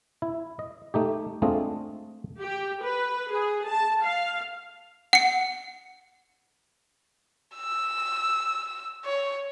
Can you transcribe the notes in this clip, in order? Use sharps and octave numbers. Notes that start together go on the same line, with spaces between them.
E4
D#5
A3 D#4 G4
G#3 A3 C4 D4 F4 D#5
G4
B4
G#4
A5
F5
F#5 C#7
E6
C#5